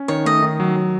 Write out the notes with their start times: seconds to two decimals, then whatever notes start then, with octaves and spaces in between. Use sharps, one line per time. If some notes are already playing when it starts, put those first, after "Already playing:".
Already playing: C#4
0.08 D#3 C#5
0.26 A3 D#5
0.43 D#3
0.60 F#3
0.76 F#3